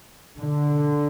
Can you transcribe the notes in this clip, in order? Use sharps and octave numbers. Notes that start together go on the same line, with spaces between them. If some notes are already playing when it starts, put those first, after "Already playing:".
D3